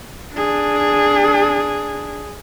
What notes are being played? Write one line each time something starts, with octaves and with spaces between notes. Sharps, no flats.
D4 G#4